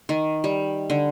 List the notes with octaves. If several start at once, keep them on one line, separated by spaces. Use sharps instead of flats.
D#3
G3
D3